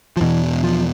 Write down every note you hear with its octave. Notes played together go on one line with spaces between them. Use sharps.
F3
E2 B2 E3
F3